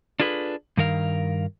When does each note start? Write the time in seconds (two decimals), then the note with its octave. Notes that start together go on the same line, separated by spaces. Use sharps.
0.20 D4 F4 G#4 A4 B4
0.77 G2 D#3 A#4 F5